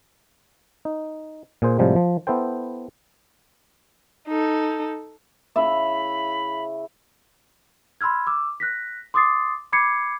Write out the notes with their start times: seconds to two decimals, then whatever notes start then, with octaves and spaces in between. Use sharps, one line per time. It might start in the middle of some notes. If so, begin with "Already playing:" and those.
0.85 D#4
1.62 A#2 G#4 C5
1.78 A2 C3 F3 G3 G#3
1.96 F3
2.27 B3 E4 A4 C5 G5
4.28 D#4 A4
5.56 C#3 E4 E5 B5
8.01 B5 C6 E6 F6 G#6
8.27 D6 E6
8.60 F#6 A#6 B6
9.14 C6 D6 D#6 A6 C7
9.73 B5 D6 G#6 C7 C#7